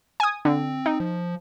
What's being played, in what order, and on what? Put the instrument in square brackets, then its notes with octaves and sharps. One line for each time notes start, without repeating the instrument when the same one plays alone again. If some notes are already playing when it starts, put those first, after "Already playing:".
[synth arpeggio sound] G#5 D#6
[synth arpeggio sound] D3 [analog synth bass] C4
[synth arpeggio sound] D#4
[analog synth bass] F3